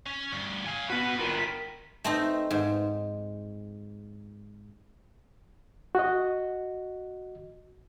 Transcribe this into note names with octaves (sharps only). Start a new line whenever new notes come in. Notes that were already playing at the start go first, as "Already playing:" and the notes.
C#4
D2 G2
F5 G#5
G2 B3 F#4 B4
F4 A#4 G5
A3 C4 D#4
G#2
F#4 D#5